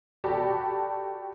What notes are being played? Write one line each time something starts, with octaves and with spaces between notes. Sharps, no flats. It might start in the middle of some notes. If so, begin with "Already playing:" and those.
F#4 G4 A4 D5 A5 B5